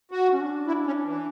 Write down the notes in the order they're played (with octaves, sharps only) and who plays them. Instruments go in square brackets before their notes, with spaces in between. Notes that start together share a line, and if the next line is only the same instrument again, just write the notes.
[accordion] F#4
[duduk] C#4
D4
[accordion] E4
C#4
E3